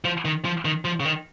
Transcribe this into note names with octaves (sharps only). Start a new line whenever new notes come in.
F3
D#3
F3
D#3
F3
C#3
D#3